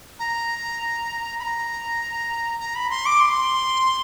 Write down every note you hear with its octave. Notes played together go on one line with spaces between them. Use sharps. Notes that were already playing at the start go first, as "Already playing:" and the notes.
A#5
B5
A#5
A#5
B5
C6
D6
C6